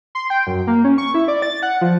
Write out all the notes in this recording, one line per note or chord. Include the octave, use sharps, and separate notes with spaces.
C6
G5
F#2
A#3
C#4
C#6
E4
D5
A6
F#5
F3